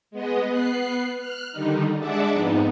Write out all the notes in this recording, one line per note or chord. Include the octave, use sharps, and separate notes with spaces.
G#3 B3 D#5
B3 F#6 C7
F6 F#6
D3 D#3 G3 D#4
G#3 D4 E5 F#5 A5 D6
F2 G#2 B3 D#4